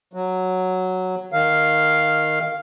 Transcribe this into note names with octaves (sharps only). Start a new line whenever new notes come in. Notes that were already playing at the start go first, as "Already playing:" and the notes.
F#3
D#3 F5